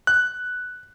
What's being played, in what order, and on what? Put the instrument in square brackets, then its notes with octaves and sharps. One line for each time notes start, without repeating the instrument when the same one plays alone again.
[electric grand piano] F#6